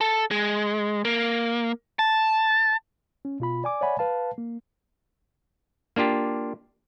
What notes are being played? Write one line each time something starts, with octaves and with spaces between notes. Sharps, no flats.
A4
G#3
A#3
A5
C#4
B2 F4 B5
D5 G#5 D6
C#5 D5 E5 F#5 G#5 B5
B4 F5 A5
A#3
A#3 D4 F4 G4